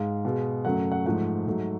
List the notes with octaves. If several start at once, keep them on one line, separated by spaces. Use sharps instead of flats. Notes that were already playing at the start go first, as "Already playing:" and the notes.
Already playing: G#2 G#3 F5
B2 G#3
F#2 C#3 F#3 A3 F#5
F#5
G#2 F3 A3 F#5
G#2 F#3 A3